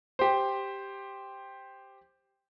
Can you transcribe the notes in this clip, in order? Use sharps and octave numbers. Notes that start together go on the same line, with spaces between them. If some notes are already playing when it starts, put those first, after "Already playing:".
G4 C5